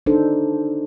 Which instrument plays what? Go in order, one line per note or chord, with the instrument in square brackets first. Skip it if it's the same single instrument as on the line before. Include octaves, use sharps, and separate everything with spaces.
[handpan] D4 D#4 A4 C5